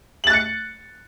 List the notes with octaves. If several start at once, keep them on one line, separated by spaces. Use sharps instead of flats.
F#6 A6 C#7 F#7